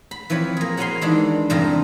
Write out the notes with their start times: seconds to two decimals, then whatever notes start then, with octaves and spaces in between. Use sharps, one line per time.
0.11 B5
0.30 E3 F3 C4 C#5 B5
0.57 A#3 G#4
0.77 F#4 C#5 F5 G#5 B5 C6
1.01 D#3 E3 G#3 D4
1.50 E2 G2 C3 G4 A4 A#4